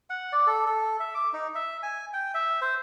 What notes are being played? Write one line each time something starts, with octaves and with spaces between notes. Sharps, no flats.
F#5
D5
A4
A4
E5
D6
D#4
E5
G#5
G5
E5
C5